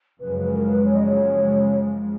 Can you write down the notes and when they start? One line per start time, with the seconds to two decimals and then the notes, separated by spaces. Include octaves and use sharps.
0.20 F#1 F#2 C#3 F3 G#3 B4
0.37 B4
0.53 A#4
0.68 B4
0.84 C#5
0.94 D#5
1.04 C#5